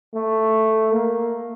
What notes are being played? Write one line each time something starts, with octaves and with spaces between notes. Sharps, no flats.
A3
A#3